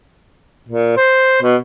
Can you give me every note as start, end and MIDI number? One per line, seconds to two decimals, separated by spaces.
0.69 0.94 46
0.97 1.39 72
1.42 1.56 47